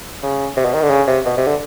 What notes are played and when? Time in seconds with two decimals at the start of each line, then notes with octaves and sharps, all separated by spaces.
0.23 C#3
0.57 C3
0.65 B2
0.74 D#3
0.82 D3
0.90 C#3
1.08 C3
1.26 B2
1.37 C3
1.47 D3